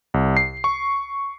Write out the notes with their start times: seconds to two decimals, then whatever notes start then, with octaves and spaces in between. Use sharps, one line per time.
0.14 C2
0.37 C7
0.64 C#6